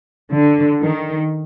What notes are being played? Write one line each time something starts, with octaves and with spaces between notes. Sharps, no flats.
D3
D#3